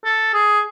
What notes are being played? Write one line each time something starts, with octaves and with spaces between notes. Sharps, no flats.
A4
G#4